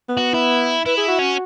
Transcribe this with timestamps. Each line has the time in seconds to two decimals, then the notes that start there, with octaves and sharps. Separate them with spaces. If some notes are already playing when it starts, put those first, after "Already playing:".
0.09 B3
0.17 F#4
0.34 E4
0.86 E4 B4
0.97 G#4
1.08 F#4
1.19 C#4